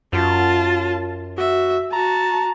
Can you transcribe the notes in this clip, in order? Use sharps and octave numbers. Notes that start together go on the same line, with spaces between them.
F#2 F4 A5
F#4 E5
F#4 A5 A#5